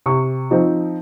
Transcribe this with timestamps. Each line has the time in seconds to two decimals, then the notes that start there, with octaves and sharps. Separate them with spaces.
0.06 C3 C#6
0.51 F3 C4 D#4